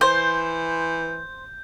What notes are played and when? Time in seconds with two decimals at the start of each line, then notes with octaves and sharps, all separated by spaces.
0.01 E3 C5 G6